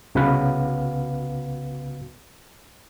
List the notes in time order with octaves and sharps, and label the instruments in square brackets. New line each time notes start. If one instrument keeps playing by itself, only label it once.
[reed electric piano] C2 C#3 B3 F#4 B4 F5